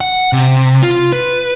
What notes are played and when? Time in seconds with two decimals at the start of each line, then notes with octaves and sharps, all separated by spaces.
0.01 F#5
0.33 C3
0.82 F4
1.13 B4